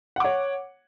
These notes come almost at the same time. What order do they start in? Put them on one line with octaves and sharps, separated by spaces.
F#5 D6 C#5